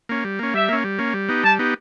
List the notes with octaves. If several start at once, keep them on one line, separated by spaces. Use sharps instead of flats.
A#3 C#4
G3
A#3 C#4
G3 E5
A#3 C#4
G3
A#3 C#4
G3
B3 D#4 G4
G3 A5
B3 D#4 G4